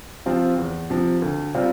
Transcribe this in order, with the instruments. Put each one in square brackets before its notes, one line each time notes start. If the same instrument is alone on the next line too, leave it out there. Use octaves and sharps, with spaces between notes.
[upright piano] C3 F3 C4 F4
E2
C3 F3
D2
C3 G3 C4 F4